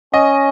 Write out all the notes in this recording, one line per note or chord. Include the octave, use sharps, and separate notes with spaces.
C#4 D#5